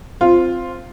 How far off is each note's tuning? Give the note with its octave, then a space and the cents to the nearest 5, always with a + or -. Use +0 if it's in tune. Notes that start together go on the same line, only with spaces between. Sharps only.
C4 +0 F4 +0